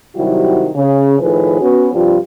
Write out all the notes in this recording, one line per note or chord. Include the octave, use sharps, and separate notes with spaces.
C3 D#3 F#3 G3 E4 F#4
C#3
A2 D#3 F3 G#4 B4
B3 C#4 F#4
G2 C3 F3 G3 F4